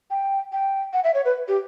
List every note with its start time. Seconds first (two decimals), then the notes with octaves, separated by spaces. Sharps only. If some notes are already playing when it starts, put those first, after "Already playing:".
0.11 G5
0.52 G5
0.93 F#5
1.04 E5
1.14 C#5
1.25 B4
1.48 G4